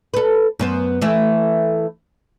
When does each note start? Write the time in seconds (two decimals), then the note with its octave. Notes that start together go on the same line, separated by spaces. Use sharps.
0.14 A4 B4
0.59 F#2 B3 C5
1.02 E3 A3 E4